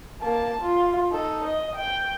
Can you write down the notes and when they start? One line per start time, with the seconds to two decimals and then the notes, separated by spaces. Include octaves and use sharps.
0.21 A#3 A5
0.62 F4
1.11 D#4 A4
1.45 D#5
1.76 G5